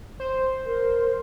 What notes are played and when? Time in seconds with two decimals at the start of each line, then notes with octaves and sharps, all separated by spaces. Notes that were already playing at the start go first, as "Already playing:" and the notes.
0.20 C5
0.66 A#4